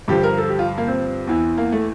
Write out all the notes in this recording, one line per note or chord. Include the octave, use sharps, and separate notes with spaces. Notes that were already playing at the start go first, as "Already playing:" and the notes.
G2 D3 F3 G4
A#4
A4
G4
F4
A#3
C4
E2 E3
A#3
A3